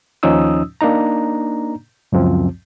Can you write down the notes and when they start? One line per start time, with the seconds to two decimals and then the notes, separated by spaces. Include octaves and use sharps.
0.23 D#2 F3 C#4 D#4 D#6 E6
0.81 A#3 D4 D#4 A#5
2.12 C#2 F#2 F3 C4